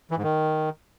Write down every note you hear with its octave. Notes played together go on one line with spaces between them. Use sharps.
E3
G#2
D#3